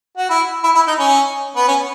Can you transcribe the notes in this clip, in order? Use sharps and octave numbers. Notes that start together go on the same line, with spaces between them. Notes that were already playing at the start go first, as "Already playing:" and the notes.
F#4
E4
E4
E4
D#4
C#4
B3
C#4